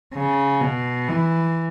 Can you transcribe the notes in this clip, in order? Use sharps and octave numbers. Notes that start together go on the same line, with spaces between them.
C#3
B2
E3